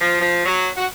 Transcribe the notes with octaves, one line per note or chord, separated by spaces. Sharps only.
F3
F3
F#3
F#4